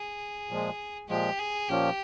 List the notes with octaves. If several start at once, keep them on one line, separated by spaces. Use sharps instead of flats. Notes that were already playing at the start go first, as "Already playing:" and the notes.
Already playing: G#4
A#2 F3 G#3
A#2 F3 G#3 G4
G#4
A#2 F3 A#3 C#4 G4